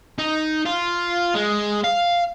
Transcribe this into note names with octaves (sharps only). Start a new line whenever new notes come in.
D#4
F4
G#3
F5